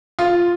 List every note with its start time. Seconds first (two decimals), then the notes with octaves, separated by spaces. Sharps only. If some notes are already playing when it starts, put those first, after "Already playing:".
0.19 F4